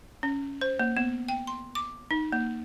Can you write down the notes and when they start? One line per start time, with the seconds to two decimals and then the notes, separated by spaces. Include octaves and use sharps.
0.23 C#4
0.61 C5
0.79 A#3
0.97 B3
1.29 G5
1.47 C6
1.75 D6
2.11 D#4
2.32 A#3